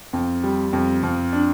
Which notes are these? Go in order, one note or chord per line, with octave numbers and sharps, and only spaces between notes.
F2
G3
F2
F2
D4